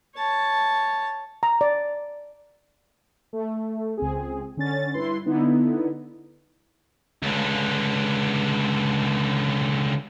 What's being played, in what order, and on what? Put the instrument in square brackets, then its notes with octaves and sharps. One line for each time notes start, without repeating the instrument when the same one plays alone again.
[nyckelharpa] C#5 A5
[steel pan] A#5
D5
[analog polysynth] A3
C#2 C4 G#4
D3 C#4 A6
G2 E4 B4 C6
D3 B3 D#4 E4
[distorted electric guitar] C#2 D3